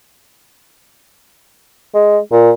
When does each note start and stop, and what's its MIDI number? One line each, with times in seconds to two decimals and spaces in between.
1.94 2.18 56
2.32 2.51 46